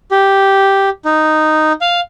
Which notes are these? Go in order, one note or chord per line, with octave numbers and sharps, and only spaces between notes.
G4
D#4
F5